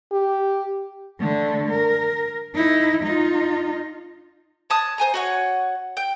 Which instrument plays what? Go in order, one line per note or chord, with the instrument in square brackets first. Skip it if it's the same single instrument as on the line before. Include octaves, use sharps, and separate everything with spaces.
[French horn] G4
[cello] D3 A3
A#4
D#4 E4
D#4 F4
[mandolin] C#5 A5 D#6 F#6
C5 G#5 A#5
F#4 C#5 F#5
G5 G6